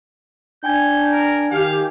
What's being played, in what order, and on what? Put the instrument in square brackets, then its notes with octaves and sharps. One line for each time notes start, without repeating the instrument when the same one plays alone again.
[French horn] D4 [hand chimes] G5 G#5 G#6 [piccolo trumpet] G6
[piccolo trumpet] A#4
[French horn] D#3 [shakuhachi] G4 [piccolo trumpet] F5